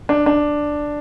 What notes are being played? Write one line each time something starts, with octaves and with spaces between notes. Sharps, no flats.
D4
D4